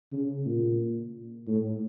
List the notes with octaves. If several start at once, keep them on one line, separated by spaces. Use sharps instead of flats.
C#3
A#2
A2